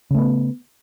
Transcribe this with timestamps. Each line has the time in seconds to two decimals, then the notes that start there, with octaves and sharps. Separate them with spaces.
0.11 C#3
0.15 A3
0.19 B3